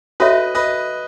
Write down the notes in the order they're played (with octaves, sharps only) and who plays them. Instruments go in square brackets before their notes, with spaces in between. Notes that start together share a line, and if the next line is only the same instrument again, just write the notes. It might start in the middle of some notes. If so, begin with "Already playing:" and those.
[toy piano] F#4 A4 C#5 E5 [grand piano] B4 D#5
[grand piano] B4 D#5